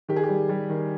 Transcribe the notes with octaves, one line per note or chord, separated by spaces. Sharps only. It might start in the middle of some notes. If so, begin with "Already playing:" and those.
D#3 G4
G#4
G4
G3
G3
D#3